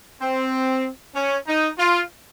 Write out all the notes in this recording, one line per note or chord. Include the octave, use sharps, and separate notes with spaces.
C4
C#4
D#4
F4